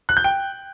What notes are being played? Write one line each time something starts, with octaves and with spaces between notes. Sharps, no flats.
F#6
G6
G5